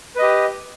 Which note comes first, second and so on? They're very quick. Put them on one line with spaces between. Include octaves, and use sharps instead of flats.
B4 D#5 G4